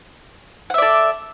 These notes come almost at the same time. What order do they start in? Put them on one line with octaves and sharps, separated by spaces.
F#5 E5 D5 A4